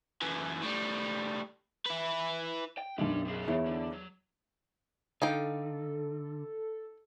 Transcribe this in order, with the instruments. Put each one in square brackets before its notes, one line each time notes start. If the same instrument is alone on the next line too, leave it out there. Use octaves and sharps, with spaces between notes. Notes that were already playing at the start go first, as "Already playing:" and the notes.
[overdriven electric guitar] F#2 E3
A2 G3
E4 B4
[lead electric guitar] G5
[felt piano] B1 F#2 [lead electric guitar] G3 D4
[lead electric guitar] C3 G#4
[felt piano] E2 E4 C#5
[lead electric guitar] D3
F#3
[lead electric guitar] D3 [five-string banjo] D#4 F5 G5 [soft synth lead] A4